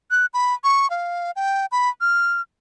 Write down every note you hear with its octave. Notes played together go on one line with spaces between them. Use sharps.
F#6
B5
C#6
F5
G5
B5
F6